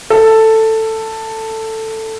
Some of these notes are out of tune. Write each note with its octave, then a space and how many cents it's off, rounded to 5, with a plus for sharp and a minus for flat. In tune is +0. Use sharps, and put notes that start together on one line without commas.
A4 +10